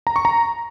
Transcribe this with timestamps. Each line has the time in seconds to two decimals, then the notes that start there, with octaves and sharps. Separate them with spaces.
0.07 A#5
0.16 C#6
0.25 A#5